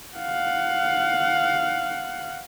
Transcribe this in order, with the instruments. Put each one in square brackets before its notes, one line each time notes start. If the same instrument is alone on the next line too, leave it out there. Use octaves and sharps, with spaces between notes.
[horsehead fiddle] F5 F#5